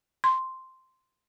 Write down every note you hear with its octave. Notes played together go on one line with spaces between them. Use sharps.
C6